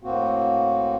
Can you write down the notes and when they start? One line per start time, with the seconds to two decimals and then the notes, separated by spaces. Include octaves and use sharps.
0.03 A2 A#3 C4 F#4